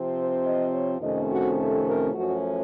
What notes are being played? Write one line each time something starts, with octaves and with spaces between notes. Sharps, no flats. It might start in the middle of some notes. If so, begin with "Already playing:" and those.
Already playing: C3 F3 C4
C5
D#5
C#5
F2 C3 D#3 A3 C#4 D#5
F#4
A4
A#4
F#2 F3 A3 C#4 F#4